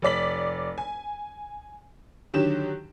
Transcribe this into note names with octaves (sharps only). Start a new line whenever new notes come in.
F1 C#5 D5 B6 F#7
G#5
D3 D#3 F#3 G4 E7